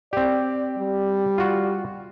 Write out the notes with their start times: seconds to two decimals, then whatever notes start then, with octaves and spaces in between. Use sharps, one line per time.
0.13 C4 G4 D5
0.78 G3
1.38 F4 F#4